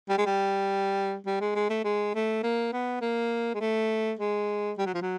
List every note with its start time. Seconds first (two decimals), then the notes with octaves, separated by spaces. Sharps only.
0.09 G3
0.18 G#3
0.26 G3
1.26 G3
1.41 G#3
1.55 G#3
1.70 A3
1.84 G#3
2.14 A3
2.43 A#3
2.73 B3
3.01 A#3
3.54 G#3
3.61 A3
4.19 G#3
4.78 G3
4.86 F#3
4.94 F3
5.02 F#3